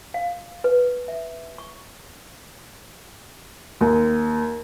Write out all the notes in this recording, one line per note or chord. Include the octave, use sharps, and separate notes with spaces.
F5
B4
E5
C#6
D#2